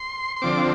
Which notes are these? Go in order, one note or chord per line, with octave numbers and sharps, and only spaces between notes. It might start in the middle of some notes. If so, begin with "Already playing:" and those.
Already playing: C6
C6
D3 F3 C4 D6